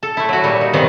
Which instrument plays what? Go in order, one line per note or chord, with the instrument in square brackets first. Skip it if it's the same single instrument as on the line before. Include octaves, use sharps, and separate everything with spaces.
[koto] A4
A3 E4
F#3 F#4
A#2 G3
D#4
C3 D#3 E3 F#3 B3